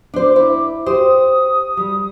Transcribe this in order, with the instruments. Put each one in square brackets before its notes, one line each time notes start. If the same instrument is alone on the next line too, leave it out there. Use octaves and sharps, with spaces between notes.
[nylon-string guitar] D4 C5 [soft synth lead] D6
[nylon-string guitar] E4
[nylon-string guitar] G4 C5 [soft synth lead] D#6
[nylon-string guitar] G3